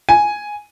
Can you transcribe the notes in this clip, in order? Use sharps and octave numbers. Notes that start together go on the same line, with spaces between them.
G#5